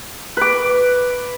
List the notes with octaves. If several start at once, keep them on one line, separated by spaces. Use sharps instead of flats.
B4 D6